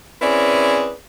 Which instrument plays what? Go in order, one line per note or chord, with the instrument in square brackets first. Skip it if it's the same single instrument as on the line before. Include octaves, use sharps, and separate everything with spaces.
[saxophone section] C4 C#4 E4 G#4 B4 D5